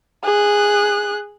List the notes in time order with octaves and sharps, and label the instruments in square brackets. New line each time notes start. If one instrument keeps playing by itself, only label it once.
[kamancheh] G#4 F#6